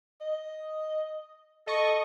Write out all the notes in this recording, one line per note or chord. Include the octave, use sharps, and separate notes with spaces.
D#5
A4 D#5 C#6